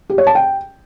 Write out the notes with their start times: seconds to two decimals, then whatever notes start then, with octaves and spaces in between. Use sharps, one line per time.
0.10 G4
0.18 C#5
0.27 A5
0.35 G5